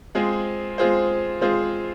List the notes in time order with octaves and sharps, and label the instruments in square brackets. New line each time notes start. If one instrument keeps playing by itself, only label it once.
[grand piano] G#3 C4 F4 G#4 C5
G#3 C4 F4 G#4 C5
G#3 C4 F4 G#4 C5